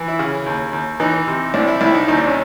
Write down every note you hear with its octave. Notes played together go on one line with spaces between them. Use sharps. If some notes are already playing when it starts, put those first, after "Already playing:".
Already playing: E3
E4
C#3
D#2
D#2
E3 D#4
C3
C2 D4
E4
C2 E4
D#4
D#2 D#4
D4
C#4